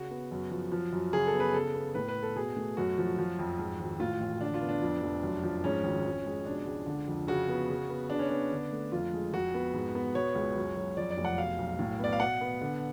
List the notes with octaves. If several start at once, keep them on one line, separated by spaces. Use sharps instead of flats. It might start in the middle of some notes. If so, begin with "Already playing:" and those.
Already playing: C#3 F#4
B3
F#2
F3
F3
F#2
C#3 G#4
A4
B3
B4
C#3 A4
B3
A2 B4
B4
B3
A4
B2 G#4
A3
F#2 F#4
F3
F3
F2
G#2
G#1
A2 F4
A1
D3 D4
F4
B3
D4
F2
F1
F#2
F3
G#2 C#4
G#1
F2
G#3
B2 D4
C#2
D3
F2
C#3 F#4
B3
C#3
B3
C#3 D4
C#4
B3 D4
D3
A3
F2 F4
G#3
F2 F#4
B3
G#2
B3
B2 C#5
C#2
F#2
F#3
F2 D5
D5
F1
F#5
B2 F5
B1
A2
B3 D5
F5
B2 F#5
B3
D3